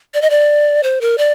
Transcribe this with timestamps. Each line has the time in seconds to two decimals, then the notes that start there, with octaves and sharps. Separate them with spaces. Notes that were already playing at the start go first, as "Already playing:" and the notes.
0.14 D5
0.22 D#5
0.30 D5
0.83 C5
1.01 A#4
1.18 D5